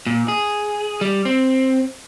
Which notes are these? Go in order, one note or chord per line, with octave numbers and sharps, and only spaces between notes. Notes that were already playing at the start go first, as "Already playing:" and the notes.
A#2
G#4
G3
C4